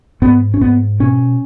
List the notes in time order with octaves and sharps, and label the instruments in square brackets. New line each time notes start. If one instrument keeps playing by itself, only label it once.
[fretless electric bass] G#2 B3
C#4
G#2 B3
B2 C#4